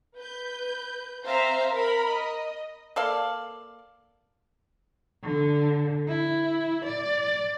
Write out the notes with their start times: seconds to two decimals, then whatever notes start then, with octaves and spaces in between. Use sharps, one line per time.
0.18 B4 G6
1.25 C4 C5 E5 F5 A#5
1.74 A#4 B5
2.09 D#5
2.96 A#3 A4 D5 F5
5.23 D3
6.08 E4
6.85 D5